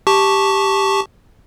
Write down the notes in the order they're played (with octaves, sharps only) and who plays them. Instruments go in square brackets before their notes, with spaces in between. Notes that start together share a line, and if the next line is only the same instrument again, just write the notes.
[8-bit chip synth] G4 A5 C#6